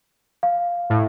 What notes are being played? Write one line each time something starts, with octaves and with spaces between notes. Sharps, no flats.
F5
A2